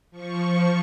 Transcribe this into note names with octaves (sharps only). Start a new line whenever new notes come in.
F3 C#6